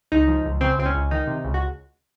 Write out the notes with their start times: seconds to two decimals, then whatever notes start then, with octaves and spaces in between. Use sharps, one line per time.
0.12 C#2 D#4
0.28 F3
0.45 C#2
0.61 C#3 C4
0.79 C#2 C4
0.86 C#4
0.94 C#2
1.11 D#3 D#4
1.27 C3
1.44 C#2
1.54 F#4